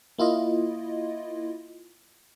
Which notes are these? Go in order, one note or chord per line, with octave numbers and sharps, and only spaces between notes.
A#3 E4 F4 D#5